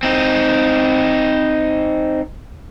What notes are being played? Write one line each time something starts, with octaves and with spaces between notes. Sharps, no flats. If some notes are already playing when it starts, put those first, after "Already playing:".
C4 D#4